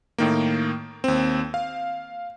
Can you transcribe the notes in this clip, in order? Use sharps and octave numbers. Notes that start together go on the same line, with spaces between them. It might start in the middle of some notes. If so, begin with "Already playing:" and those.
A2 D#3 A#3
D#2 C4
F5